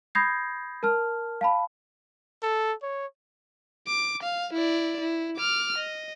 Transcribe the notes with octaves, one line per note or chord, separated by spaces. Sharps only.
B5 D#6 G6 G#6 A#6 C7
A#4 A5 F6
F5 A5 B5
A4
C#5
D6
F5
E4 D5
E4
D6 F6
D#5